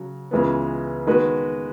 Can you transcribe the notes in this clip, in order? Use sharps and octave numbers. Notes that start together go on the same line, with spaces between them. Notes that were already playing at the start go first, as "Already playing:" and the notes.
Already playing: C#3 F#3
C#2 C#3 E3 G#3 B3
D#3 G#3 B3 F#4 B4